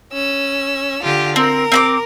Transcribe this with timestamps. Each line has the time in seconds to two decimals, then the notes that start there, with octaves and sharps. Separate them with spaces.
0.13 C#4 E6
1.03 D3 F4 G4
1.36 C4 A#4
1.72 C4 A5 D6